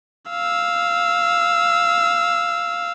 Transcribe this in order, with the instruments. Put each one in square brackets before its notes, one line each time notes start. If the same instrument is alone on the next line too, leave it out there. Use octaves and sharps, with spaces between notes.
[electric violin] F5 E6